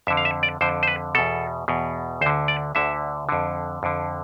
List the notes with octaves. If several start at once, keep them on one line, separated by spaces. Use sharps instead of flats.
F2 D3 E5
F5
E5
D5
F2 D3 C5
C5
B4
E2 B2 A4
E2 B2
D2 D3 C5
D5
D2 D3 E5
F2 D3
F2 D3